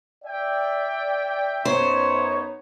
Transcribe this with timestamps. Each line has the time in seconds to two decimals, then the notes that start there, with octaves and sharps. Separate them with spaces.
0.25 D5 E5 G5
1.65 F#2 B3 D#4 C5 C#5